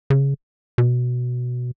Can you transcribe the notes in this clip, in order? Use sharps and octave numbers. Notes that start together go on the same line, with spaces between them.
C#3
B2